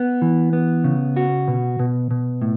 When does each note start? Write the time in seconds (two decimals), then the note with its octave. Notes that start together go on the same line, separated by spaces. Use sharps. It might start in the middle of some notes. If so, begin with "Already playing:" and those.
Already playing: B3
0.22 E3
0.53 B3
0.84 C#3
1.17 F#4
1.48 B2
1.79 B2
2.11 B2
2.42 A2